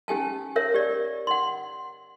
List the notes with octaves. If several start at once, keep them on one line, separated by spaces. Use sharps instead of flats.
C#4 G4 G#5 A5
A#4 C#5 E5
G4 D5
F#5 C6